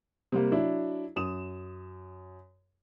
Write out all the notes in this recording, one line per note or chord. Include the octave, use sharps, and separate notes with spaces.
C3 G3 A#3
F#3 D4 E4
F#2 D#6 E7